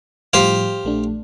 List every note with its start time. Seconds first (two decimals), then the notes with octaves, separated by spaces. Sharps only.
0.33 A2 F3 G3 G4 C5 F5
0.84 A#1 A3 D4